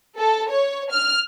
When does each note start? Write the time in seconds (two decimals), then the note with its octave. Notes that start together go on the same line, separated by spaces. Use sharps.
0.17 A4
0.50 C#5
0.91 F6